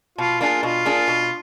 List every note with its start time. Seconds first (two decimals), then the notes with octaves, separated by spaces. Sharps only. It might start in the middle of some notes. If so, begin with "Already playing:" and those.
0.18 B2 F4
0.41 A#3 D4 F4 G#4
0.63 B2 F4
0.85 A#3 D4 G#4
1.08 B2